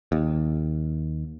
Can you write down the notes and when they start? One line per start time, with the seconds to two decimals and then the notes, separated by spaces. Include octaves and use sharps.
0.12 D#2